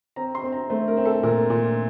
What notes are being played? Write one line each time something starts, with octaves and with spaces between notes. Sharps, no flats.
C4 A#5
C6
C4
A#5
A3 C5
A#4
C4
A4
A#2 A#4
A#2